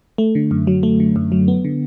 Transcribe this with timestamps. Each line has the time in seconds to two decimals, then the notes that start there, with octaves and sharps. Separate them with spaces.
0.18 A3
0.35 D3
0.51 F#2
0.67 F#3
0.83 A3
1.00 D3
1.16 F#2
1.32 F#3
1.48 B3
1.65 D3